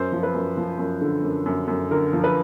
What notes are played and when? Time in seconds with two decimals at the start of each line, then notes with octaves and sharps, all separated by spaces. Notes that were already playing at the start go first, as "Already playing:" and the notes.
Already playing: F#2 C5
0.12 F3
0.23 B4
0.35 F#2
0.57 F3
0.79 F#2
1.01 D3
1.23 F#2
1.46 F#2
1.68 F#2
1.91 D3 A#4
2.13 F3
2.24 B4